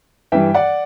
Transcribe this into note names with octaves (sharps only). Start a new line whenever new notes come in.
G2 E3 E5 G5
D5 F#5